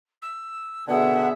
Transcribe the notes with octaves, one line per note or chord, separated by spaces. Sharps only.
E6
B2 D3 B3 G#4 E5 F#5